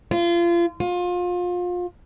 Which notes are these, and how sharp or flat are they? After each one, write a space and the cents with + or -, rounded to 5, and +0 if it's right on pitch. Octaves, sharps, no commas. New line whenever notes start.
F4 -30
F4 +30